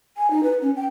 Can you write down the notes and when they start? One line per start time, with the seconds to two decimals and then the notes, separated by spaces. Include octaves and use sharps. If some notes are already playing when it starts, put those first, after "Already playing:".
0.17 G#5
0.31 D#4
0.43 B4
0.62 C#4
0.76 G5